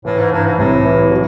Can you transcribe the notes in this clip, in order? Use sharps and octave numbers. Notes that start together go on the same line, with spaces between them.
A2 E3
G#2
G2 E3
G#2
C2 A2
E3
F#3